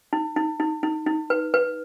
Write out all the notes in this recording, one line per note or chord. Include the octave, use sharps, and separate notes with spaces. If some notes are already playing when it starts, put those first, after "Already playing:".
D#4
D#4
D#4
D#4
D#4
B4
B4